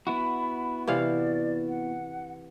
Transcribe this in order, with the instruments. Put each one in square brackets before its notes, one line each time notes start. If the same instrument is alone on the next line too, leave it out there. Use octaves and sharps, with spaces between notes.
[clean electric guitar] B3 E4 F#4 [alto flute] B5
[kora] C3 E3 F5 [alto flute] D5
[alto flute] F#5